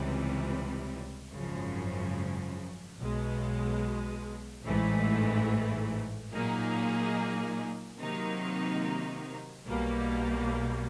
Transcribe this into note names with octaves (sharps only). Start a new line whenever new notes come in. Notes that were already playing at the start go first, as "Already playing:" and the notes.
Already playing: C#2 C3 E3 G3
G#1 F#2 C#3 F3
B1 B2 G#3
A1 G#2 E3 A3
A#2 F#3 A#3 D#4 G#4
C3 D#3 F#3 A#3 D#4
B1 B2 G3 A#3